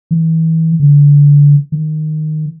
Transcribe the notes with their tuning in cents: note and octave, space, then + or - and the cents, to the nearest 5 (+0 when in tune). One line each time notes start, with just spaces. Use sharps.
E3 -30
D3 -25
D#3 -10